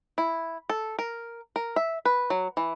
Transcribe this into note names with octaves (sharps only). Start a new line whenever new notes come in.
E4
A4
A#4
A#4
E5
B4
F#3
E3